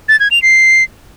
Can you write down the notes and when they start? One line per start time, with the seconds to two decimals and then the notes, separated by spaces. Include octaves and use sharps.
0.09 A6
0.20 G#6
0.31 F7
0.42 C7